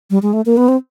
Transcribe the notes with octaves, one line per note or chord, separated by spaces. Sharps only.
G3
G#3
A3
A#3
B3
C4